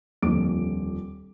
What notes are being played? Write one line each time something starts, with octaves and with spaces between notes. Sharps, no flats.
D#1 F2 D3 D6 D7